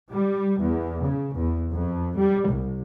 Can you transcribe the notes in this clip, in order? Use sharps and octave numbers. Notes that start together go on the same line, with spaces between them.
G3
E2
C#3
E2
F2
G3
C2